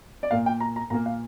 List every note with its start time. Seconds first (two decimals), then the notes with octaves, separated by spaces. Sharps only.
0.23 D5
0.31 A#2 A#3 F5
0.46 G5
0.60 A#5
0.76 A#5
0.90 A#2 A#3 A#5
1.06 F5